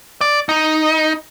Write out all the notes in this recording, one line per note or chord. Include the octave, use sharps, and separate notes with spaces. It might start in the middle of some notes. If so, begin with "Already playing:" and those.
D5
D#4